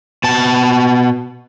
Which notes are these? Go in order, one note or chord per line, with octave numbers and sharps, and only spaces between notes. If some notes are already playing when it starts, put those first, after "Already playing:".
B2 A5